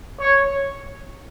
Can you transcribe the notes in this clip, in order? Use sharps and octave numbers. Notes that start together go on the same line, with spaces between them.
C#5